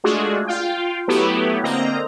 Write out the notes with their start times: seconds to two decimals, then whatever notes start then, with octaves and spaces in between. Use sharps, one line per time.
0.04 G#3 A3 D4 F4 F#4 G#4
0.47 F4 F5 G5
1.08 F#3 A3 B3 E4 G4
1.63 D3 A#3 C4 D#5 A#5